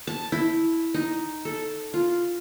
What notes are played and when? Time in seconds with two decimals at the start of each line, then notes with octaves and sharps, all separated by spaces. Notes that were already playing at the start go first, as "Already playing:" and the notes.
0.07 A5
0.32 E4
0.94 D#4
1.45 A4
1.94 F4